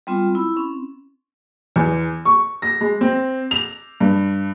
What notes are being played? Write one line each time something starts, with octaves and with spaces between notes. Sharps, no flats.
G3 G#3 B3 C4 F4
E4 B5
C4 C#4
E2
C#6
A#6
G#3
C4
F7
G2